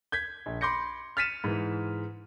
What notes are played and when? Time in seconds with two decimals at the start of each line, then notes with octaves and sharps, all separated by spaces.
0.12 G6 G#6 B6
0.46 A#1
0.61 B5 C6 D6 G6 A#6 C#7
1.17 F6 A6 B6 C#7 D#7 E7
1.44 G#2 E3